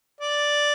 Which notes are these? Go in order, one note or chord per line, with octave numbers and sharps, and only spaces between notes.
D5